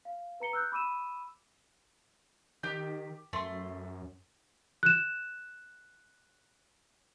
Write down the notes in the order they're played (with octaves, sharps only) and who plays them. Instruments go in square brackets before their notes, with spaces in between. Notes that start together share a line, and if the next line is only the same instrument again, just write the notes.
[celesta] F5
B4 A#5 C#7 G7
E6 F#6 G6
B5 D6 E6 D#7 E7
[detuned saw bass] D#3 [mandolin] G4 G6
[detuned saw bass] F#2 [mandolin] A3 C6
[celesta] F#6 E7